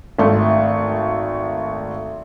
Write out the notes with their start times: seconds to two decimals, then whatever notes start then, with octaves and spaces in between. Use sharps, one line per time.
0.19 G#1 A3